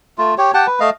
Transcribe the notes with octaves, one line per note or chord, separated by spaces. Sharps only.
A3 F4
G4 C#5
G4 F#5 G5 A5
B4
A3 D#5 F5